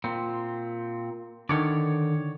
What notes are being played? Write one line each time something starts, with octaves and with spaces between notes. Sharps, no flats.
A#2 C4
D3 D#3 C#5 D5